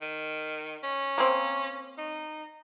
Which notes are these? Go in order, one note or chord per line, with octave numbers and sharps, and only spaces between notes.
D#3
C#4
A#3 C4
D#4